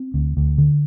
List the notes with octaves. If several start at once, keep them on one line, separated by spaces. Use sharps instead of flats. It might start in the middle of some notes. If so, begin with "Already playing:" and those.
Already playing: C4
D2
D2
D3